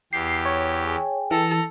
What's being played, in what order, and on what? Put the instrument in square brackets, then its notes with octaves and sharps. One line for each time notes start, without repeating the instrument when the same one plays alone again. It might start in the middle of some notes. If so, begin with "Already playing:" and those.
[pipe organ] E2 G4 [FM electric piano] C7
[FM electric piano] C#5
[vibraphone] G#4 G5 G#5
[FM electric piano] E3 [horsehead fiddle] A4 [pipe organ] A#5